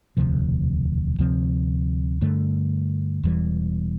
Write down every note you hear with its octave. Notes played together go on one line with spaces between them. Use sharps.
E1 D2 C3 F3
D2 C3 F3 C4
G2 D3 A3
E1 E2 E3 G3